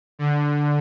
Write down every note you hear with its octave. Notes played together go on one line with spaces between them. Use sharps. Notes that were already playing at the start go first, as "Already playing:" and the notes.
D3